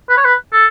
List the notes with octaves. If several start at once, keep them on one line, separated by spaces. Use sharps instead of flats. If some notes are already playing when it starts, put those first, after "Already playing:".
B4
C#5
B4
A4